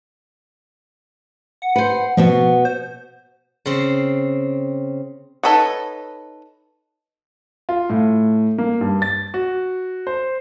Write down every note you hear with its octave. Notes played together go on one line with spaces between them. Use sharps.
F#5
B4 C5 F#5
B2 F3 B3 F#4
C5
C#3 C4
D#4 A4 B4 C#5 F#5
F4
A2
A#3
G2
A6
F#4
C5